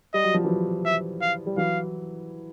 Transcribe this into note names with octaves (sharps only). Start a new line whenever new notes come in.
G3 D#5
F#3
F3
E3 F#3
E5
F5
G3
E3 F#3 F5